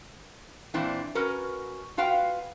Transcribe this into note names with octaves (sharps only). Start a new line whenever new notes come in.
A#2 E3 C4 D4 E4
C#4 F#4 A#4 B4
F4 F#4 B4 F5 G5